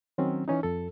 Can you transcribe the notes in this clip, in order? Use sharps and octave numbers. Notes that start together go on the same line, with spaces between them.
D#3 F#3 C4 C#4
E3 C#4 D#4
F2 A4